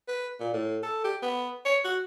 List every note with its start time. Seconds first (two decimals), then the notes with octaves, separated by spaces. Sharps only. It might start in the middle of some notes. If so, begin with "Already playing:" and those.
0.08 B4
0.40 A#2
0.53 A2
0.83 A4
1.04 G4
1.22 B3
1.65 C#5
1.85 F#4